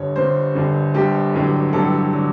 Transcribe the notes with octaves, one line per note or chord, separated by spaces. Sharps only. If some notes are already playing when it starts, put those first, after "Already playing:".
Already playing: G1 G2 D3 C#5
G1 G2 D3 C5
G1 G2 D3
G1 G2 D3 G4
A1 G2 D3 F#3
A1 G2 D3 F#3 A4
D3 F#3